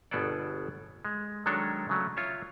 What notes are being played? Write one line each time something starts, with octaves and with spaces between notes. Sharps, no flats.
G1 B2 B3 G#4 A4 D5
G#3
D#3 F#3 G#3 D4 A4 C#5
C#3 F#3 A3
F4 C#5 E5